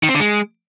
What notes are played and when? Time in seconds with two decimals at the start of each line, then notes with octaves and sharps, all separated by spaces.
0.03 D#3
0.09 C4
0.14 D3
0.20 G#3